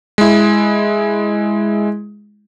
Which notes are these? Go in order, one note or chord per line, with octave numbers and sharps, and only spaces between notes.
G#3 E4